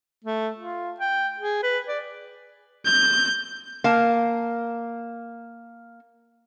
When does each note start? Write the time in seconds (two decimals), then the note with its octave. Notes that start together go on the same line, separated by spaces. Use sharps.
0.24 A3
0.58 F4
1.00 G5
1.40 G#4
1.63 B4
1.88 D5
2.85 G6
3.84 A#3 F5 A5